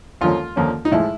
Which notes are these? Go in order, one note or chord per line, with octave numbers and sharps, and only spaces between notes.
D#2 D3 F3 A#3 C#4 F4
D#2 D3 F3 A#3 C#4
D#4
A2 F3 G#3 E4